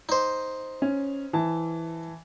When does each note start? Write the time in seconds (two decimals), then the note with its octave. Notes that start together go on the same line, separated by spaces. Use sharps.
0.09 D#4 C5
0.82 C#4
1.33 E3 A5